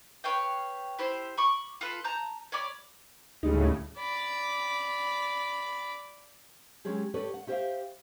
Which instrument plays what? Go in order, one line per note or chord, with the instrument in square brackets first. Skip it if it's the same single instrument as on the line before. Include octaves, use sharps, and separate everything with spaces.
[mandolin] B4 C#5 F5 G5
E4 G4 C5
B5 C#6 D6
F4 A4 B4
A5 A#5 G6
C#5 D5 B5 D6
[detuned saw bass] D2 [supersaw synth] A2 C#3 [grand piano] G3 G#3 D#4
[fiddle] D5 B5
[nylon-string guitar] F#3 G#3 C#4 G4 G#4
G4 A4 B4 C#5 D5
F#5
E4 G4 C5 C#5 E5 F5